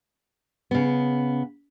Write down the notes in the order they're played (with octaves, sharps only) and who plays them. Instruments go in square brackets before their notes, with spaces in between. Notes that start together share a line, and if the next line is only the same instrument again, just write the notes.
[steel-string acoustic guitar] C#3 B3